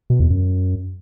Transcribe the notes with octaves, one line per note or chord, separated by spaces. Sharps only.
B2
E2
F#2